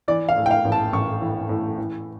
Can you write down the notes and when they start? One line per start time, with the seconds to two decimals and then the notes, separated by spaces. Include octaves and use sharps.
0.08 E3 D5
0.29 F5
0.37 A2
0.46 G5
0.51 F5
0.65 A1
0.72 A5
0.93 A1 C#6
1.21 E3
1.49 A2
1.78 E3